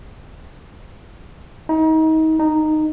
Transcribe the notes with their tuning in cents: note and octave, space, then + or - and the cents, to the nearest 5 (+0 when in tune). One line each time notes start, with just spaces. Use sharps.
D#4 +30
D#4 -10